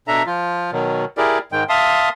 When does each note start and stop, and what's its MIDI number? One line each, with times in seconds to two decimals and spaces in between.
0.08 0.23 47
0.08 0.23 62
0.08 0.23 69
0.08 0.23 76
0.08 0.23 82
0.26 0.71 53
0.26 0.71 65
0.72 1.05 47
0.72 1.05 51
0.72 1.05 54
1.17 1.38 64
1.17 1.38 67
1.17 1.38 68
1.17 1.38 70
1.17 1.38 74
1.52 1.64 44
1.52 1.64 51
1.52 1.64 56
1.52 1.64 79
1.69 2.09 76
1.69 2.09 77
1.69 2.09 81
1.69 2.09 84
1.69 2.09 87